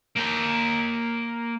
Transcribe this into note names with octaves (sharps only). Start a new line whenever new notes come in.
A#3 G5